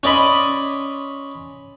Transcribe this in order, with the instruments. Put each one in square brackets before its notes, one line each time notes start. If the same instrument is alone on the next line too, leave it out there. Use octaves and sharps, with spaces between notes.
[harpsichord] C#4 D5 D#5 B5 C6